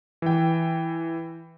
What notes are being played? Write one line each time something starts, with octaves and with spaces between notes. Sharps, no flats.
E3 G5